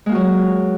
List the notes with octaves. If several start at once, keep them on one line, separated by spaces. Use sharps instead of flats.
F#3 G#3 A#3 F#4